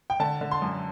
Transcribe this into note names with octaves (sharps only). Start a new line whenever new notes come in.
G5
D3 A5
D3
C6
F#2